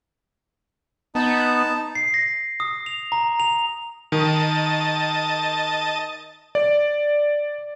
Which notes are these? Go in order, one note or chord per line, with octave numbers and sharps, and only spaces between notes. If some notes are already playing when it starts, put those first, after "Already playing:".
B3 D#4 A5
C7
A#6
D#6
F7
A#5
F7
D#3 D#5 A5
D5